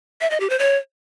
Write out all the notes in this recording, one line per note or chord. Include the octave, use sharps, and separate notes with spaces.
E5
D#5
G4
C5
C#5